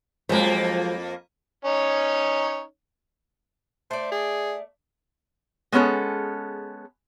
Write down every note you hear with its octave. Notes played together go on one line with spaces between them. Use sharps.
F2 F3 F#3 G#3 A#3
C#4 D#4 C#5
A3 C5 D5
G#4
G#3 B3 C#4 G#4 A4